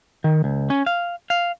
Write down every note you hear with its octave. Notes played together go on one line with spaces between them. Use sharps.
D#3
C#2
C#4
F5
F5